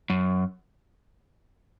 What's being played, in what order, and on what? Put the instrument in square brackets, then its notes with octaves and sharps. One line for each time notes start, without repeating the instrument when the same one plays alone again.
[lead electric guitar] F#2